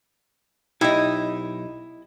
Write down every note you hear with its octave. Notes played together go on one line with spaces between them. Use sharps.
B1 D#4 E4 G4 D#5